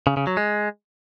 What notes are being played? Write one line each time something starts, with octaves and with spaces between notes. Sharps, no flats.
C#3
C#3
F#3
G#3